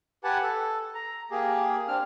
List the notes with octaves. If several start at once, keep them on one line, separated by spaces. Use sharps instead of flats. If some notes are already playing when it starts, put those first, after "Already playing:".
G4 B4 F#5 G#5 A5
A4
A#5
A#3 G4 G#4
C4 D4 F6